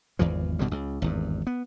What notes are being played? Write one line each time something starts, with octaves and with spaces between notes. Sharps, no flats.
G#1 E2 E3 F3
G1 B2 D3 G3
C#2
G#1 E2 G2
B3